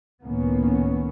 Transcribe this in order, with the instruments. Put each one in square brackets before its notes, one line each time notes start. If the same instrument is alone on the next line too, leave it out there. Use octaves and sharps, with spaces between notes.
[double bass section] C#2 A2 D#3 A#3 B3 C#4